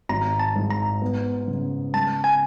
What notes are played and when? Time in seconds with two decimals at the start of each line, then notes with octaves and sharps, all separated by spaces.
0.09 G#1 A#5
0.39 A5
0.56 G#2
0.70 A#5
1.02 B3
1.48 C#3
1.94 G#3 A5
2.24 G#5